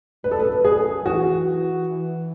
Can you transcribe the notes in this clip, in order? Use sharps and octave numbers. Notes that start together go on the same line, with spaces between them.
F#2 B4
A4
B4
G#4
E3 F#4